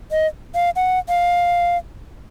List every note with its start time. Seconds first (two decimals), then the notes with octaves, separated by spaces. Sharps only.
0.11 D#5
0.55 F5
0.76 F#5
1.09 F5